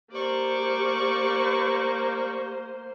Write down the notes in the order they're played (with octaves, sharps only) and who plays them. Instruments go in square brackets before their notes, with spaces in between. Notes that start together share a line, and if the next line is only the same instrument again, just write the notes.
[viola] A#3 C5 [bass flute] G4 [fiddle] D5 C#6